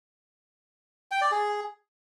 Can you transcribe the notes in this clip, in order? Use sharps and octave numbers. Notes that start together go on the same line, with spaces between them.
G5
D5
G#4